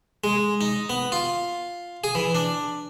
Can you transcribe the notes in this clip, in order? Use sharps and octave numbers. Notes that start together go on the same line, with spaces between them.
G#3
D#4
B3
F4
G#4
E3
D4